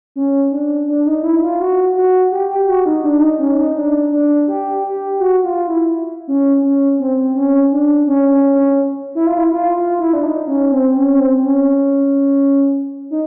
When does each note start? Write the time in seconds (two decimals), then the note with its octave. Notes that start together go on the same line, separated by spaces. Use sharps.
0.16 C#4
0.51 D4
0.88 D4
1.06 D#4
1.23 E4
1.42 F4
1.60 F#4
1.96 F#4
2.32 G4
2.50 G4
2.68 F#4
2.86 D#4
3.04 D4
3.21 D#4
3.39 C#4
3.58 D#4
3.76 D4
4.11 D4
4.48 G4
4.84 G4
5.19 F#4
5.44 F4
5.67 E4
6.28 C#4
6.63 C#4
7.00 C4
7.35 C#4
7.72 D4
8.07 C#4
8.31 C#4
8.55 C#4
9.15 E4
9.27 F4
9.38 E4
9.51 F4
9.76 F4
9.99 E4
10.13 D4
10.23 D#4
10.47 C#4
10.71 C4
10.95 C#4
11.13 C#4
11.19 C4
11.43 C#4
13.11 D#4